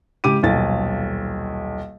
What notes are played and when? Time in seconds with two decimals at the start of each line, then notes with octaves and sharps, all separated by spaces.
0.24 G#2 C#3 G4 D6 D#7
0.42 D#1 B1 A6